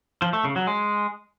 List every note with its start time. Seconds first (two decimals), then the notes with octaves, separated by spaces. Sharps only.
0.22 F3
0.33 A3
0.45 C#3
0.56 F#3
0.67 G#3